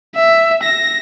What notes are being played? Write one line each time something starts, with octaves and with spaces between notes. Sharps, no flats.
E5
A#6